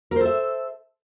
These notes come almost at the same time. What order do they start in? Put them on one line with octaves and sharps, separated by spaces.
A#4 C5 A4 E5